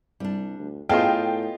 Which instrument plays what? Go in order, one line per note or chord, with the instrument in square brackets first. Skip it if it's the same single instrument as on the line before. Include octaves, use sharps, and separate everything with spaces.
[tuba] C2 [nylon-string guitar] G3 D4
[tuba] D2
[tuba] A2 [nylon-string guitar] B3 G#4 A4 [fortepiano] F4 D#5 F5 [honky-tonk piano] G5